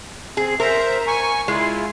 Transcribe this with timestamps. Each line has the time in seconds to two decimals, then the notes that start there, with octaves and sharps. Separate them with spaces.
0.37 C4 G#4
0.60 A#4 C5 E5 A#5
1.07 G#5 C#6
1.48 G#3 E4 F4